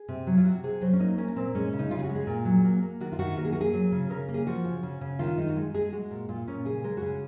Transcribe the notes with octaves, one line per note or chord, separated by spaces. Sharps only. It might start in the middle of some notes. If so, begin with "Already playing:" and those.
Already playing: G#4
C3
F#3
F4
C3 F#4
C3 G#4
F#3 C5
C#4
A#3 D#4
A#3 C#4
C#4
A#2 C4
G#3 C#4
C#3
D#4
C#3 F4
G#4
F#4
G#3
G#4
A#2
F#3
A#3
A#3
D#3 F#4
F4
D#3 F#4
A#3 A#4
G#4
A#3 F#4
G#4
F#3
C#3
C#3 A#4
A#3
G#4
F3 F#4
C#3
C#3
C#3
D#3 F4
G#3 D#4
F#4
G#3 F4
G#3 G#4
G#3 F#4
A#2
A#2 F4
A#2 C#4
C#3 G#4
G#3 A#4
F#4
C#3 G#4